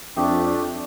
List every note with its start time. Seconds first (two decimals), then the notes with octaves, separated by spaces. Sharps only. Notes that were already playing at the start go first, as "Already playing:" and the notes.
0.16 F2 A3 D4 G4 E5 G5 D#6